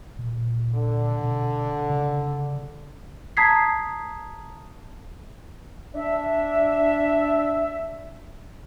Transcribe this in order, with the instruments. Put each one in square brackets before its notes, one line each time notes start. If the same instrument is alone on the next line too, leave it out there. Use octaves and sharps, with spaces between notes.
[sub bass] A#2
[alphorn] D3
[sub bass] B2
C#3
[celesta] A5 A#5 D#6 G#6 B6 C7
[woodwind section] D4 E5